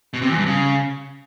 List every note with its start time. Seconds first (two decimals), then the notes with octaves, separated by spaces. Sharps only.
0.13 B2
0.22 C3
0.30 E2
0.38 G2
0.46 C#3